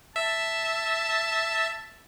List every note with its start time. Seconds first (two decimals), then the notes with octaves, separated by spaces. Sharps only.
0.16 E5 A5